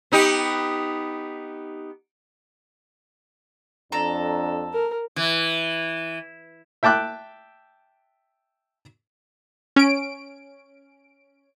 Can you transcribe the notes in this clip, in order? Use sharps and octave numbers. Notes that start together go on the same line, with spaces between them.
B3 D#4 G4
F2 D4 A4 A#5
A#4
E3
E5 G5 A5 D6 F#6
C#4 D7